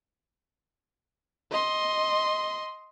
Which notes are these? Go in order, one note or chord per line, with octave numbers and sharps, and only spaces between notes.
D#5 C6